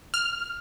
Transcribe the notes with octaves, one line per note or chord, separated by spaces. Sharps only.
F6